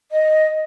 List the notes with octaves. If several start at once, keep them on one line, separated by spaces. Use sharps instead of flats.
D#5